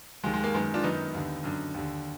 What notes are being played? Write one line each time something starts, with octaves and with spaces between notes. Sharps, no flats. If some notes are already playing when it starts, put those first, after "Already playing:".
D#2 D#3 G#3
G#3
A#3
F#2 D#3 G#3 B3
D4 F4
F#2 D#3 B3 D#4
D#2 D3
F#2 D3
D#2 D3